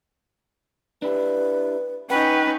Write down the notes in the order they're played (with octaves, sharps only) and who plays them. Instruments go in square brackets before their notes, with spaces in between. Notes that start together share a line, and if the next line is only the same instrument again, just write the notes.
[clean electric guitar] D4 E4 G4 [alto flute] B4
[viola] C#4 D#4 [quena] B4 [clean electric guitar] F#5 [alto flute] G5